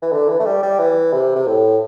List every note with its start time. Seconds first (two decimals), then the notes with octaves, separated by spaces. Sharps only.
0.02 E3
0.12 D3
0.28 E3
0.40 A3
0.45 G3
0.62 G3
0.79 E3
1.13 C3
1.35 C3
1.47 A2